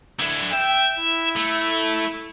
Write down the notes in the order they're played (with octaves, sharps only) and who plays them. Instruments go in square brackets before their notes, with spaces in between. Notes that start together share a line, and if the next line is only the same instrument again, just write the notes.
[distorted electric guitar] D3 E4
[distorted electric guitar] E5 [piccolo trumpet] G5
[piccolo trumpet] E4
[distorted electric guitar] A3